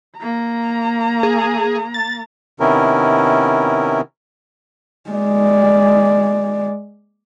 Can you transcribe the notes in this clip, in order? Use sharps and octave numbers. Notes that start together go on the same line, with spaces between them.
A#3 A#5
G#4
A6
C3 D#3 B3 C#4 E4 A#4
G#3 D5